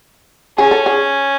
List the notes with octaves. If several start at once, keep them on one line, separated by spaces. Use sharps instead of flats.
C#4 G#4
A4
G#4